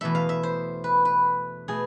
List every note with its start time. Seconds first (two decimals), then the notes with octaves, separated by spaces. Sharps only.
0.01 E2 B2 A3 E5
0.15 F5
0.29 E5
0.43 C5
0.84 B4
1.05 B4
1.68 B2 A3 G#4